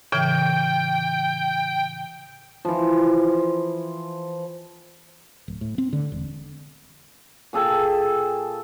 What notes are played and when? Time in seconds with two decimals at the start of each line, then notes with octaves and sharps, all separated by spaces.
0.12 A2 C#3 E3 G5
2.65 E3 F3
5.48 D1
5.61 A2
5.78 C4
5.93 D3
6.12 E1
7.53 A#2 G#4 A4 G5